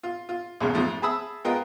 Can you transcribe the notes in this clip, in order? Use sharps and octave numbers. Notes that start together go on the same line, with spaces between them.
F4
F4
B1 E2 A#2 C#3 G#3
F2 G#2 F3 A3
G#4 E5 A5 B5 D#6 E6
G#3 B3 F4 A#4 D#5 G5